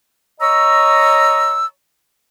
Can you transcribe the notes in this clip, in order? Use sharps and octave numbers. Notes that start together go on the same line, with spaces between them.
C#5 D#5 A#5 C#6 E6